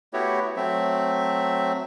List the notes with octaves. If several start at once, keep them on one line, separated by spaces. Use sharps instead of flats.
A3 B3 E4 F#4 G4 C#5
F#3 A3 C4 E5